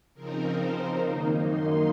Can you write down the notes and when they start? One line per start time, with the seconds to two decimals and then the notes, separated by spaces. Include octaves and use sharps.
0.14 C#3 F3 C4 D#4 A#4
0.57 C5
0.98 F#2 D#3 A#3 D#4
1.39 C6